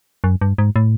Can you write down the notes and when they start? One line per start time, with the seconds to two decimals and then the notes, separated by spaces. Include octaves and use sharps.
0.24 F#2
0.41 G2
0.58 G#2
0.76 A2